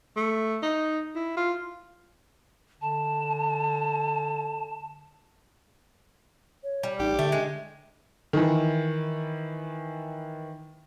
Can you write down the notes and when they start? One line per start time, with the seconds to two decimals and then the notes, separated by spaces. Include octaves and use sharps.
0.16 A3
0.62 D#4
1.15 E4
1.37 F4
2.82 D3 A5
6.63 C#5
6.83 G3
6.99 A1 D#4 G4
7.19 D3 A3 E5
7.32 G#3
8.33 D#3 E3